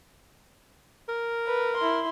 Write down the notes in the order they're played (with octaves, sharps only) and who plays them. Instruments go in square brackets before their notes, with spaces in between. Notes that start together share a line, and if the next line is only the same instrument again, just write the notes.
[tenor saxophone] A#4
[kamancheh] B4
E4 C6